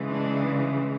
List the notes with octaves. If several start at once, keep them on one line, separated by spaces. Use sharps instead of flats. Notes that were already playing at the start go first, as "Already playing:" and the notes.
Already playing: C#3 E3 G#3
D4